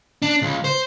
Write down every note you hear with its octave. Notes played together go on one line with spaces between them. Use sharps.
D4
C#2
C5